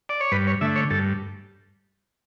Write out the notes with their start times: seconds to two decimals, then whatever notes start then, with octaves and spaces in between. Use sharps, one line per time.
0.09 D5
0.21 C#5
0.32 G2 B4
0.47 C#5
0.61 D3 A3 E5
0.76 C#5
0.90 G2 A4